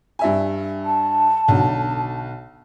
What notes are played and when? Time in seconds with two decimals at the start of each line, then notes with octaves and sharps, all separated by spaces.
0.19 G2 E5 G#5
0.85 A5
1.48 B1 D3